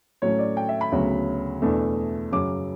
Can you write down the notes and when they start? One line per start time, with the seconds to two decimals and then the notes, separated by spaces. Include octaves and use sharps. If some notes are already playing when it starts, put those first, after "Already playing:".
0.22 A2 F#3 A3 C#4 C#5
0.39 D5
0.57 G5
0.69 E5
0.81 B5
0.92 D2 C#3 F#3 B3
1.62 E2 B2 A3 D4
2.32 F#2 C#3 F#3 D6